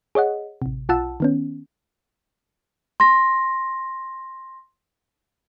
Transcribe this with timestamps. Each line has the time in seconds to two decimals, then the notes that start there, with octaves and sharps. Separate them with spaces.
0.15 G#4 C#5 D#5 F#5
0.62 A1 C3
0.89 B1 F4 F#5 A5 E6
1.20 D#3 B3 C#4
3.00 C6 A#6